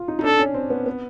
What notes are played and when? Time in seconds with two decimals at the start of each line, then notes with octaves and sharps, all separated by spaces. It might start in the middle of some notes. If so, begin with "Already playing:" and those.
Already playing: F4
0.08 D#4
0.19 D#4
0.24 D4 A4
0.39 C#4
0.54 C4
0.70 B3
0.86 B3